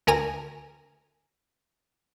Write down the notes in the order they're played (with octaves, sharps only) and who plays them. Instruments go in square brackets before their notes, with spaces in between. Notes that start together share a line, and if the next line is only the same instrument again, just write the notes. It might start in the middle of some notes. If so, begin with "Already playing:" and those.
[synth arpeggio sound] D2 A#4 G#5 A#6